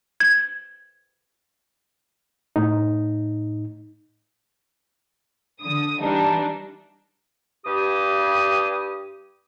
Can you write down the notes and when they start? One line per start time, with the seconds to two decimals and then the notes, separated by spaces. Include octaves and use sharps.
0.20 G#6
2.56 A2 D#4
5.62 D3 D#6
6.01 E3 G3 D4 D#4
7.65 G2 G4 D#6